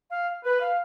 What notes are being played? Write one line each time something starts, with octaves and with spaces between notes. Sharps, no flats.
F5
B4
F5